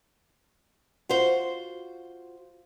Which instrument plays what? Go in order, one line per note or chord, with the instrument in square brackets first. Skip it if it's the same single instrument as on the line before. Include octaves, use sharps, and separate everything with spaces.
[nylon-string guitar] F4 F#4 C5